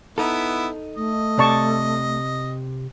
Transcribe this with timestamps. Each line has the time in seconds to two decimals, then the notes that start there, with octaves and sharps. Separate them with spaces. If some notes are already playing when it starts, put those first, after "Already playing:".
0.18 B3 D#4 E4 A4
0.96 A3 D#5
1.39 C3 D5 A5 C#6